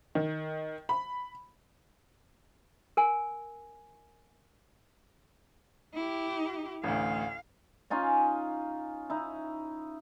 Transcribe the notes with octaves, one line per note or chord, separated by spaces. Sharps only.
D#3
B5
A#4 G#5
E4 G4
A1 D2 F5
C#4 D#4 F4 G#5
D#4 E4